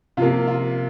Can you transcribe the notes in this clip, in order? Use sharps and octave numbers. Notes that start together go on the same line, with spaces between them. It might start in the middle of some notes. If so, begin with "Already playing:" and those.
C3 F3 A#3 F4
F4